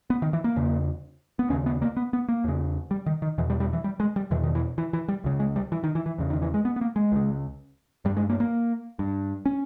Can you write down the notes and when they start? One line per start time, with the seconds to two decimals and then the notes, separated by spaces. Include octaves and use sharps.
0.10 B3
0.22 D#3
0.33 E3
0.44 A#3
0.56 E2 C#3
1.39 B3
1.50 D#2 C#4
1.53 C#3
1.66 B3
1.82 A#3
1.97 B3
2.13 B3
2.29 A#3
2.44 E2 C#3
2.91 G3
3.06 D#3
3.22 D#3
3.38 E2 B2 E3
3.50 G3
3.60 G3
3.73 E3
3.84 G3
4.00 G#3
4.16 G3
4.31 E2 B2 E3
4.43 D#3
4.55 E3
4.78 E3
4.93 E3
5.08 G3
5.24 C#2 C#3
5.40 G#3
5.56 G3
5.72 E3
5.84 D#3
5.95 E3
6.06 E3
6.18 E2 C#3
6.30 D#3
6.42 E3
6.54 G#3
6.65 B3
6.76 B3
6.81 A#3
6.96 G#3
7.12 C#2 C#3
8.05 G2 G3
8.17 G#3
8.30 A#3
8.40 A#3
8.99 G2
9.46 C#4